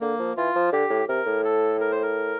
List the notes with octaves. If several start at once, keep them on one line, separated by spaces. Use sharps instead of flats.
D3 A#3
F3
E3 F4
F3
D3 G4
A2
C3 A#4
A2
A4
A#4
C5
A#4